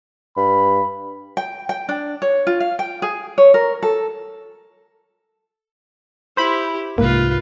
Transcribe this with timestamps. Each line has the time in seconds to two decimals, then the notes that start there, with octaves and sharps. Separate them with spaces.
0.37 G2 B5
1.37 G5
1.69 G5
1.89 D4
2.22 C#5
2.47 F4
2.60 F5
2.79 G5
3.02 G#4
3.38 C#5
3.54 A#4
3.83 A4
6.37 E4 G4 C5 B5
6.98 C2 G#2 A#3 F4 B4